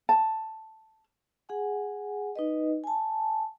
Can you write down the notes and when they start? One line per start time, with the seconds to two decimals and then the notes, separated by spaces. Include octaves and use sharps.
0.09 A5
1.49 G#4 F#5 G#5
2.36 D#4 B4 D#5
2.84 G#5 A5